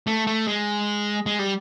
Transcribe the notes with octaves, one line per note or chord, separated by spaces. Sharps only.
A3
A3
G#3
G#3
G3